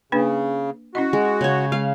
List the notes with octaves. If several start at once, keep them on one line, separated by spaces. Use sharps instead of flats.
C#3 A#3 D4 B4
C#4 E4 F#4 D#5
G#3
C#3 C#5
G#3 F5